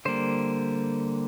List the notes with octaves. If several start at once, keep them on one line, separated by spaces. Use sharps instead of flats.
D3 G3 A#3 C5